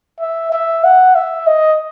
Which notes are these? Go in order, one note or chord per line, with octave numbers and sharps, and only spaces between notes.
E5
E5
F#5
E5
D#5